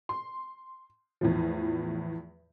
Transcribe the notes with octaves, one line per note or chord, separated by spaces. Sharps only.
C6
E2 A2 F3